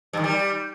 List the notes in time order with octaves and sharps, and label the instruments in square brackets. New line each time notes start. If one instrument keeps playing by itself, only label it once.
[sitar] G2
D#3
G3